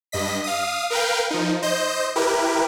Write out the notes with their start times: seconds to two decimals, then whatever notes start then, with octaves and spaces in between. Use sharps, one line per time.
0.12 G2 D#5 B6
0.44 F5 D#6
0.90 A#4 B4 F5 G5
1.31 F3 D#4
1.62 C5 D#5 G6
2.16 E4 G4 A#4 B4